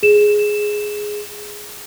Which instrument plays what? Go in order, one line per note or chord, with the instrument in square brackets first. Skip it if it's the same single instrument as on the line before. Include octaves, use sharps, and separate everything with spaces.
[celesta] G#4 E7